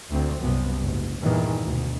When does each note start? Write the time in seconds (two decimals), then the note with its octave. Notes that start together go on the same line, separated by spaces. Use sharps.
0.10 D2 C4
0.40 C2 F#2 C3 B3
0.80 F#1 G#2
1.23 E2 G2 A#2 D#3 E3
1.63 D2 B2